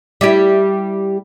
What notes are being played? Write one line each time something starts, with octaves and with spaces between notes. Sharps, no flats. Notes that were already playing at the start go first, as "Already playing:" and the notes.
G3 E4 G4